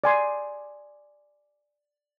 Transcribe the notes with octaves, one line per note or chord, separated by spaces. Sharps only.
D5 G#5 C6